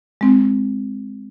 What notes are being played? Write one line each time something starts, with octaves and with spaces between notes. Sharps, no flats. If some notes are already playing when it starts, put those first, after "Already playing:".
G#3 C4